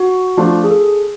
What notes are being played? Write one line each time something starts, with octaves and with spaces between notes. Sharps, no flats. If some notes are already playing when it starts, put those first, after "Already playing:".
Already playing: F#4
F3 A3 D4 F4
G#4
A4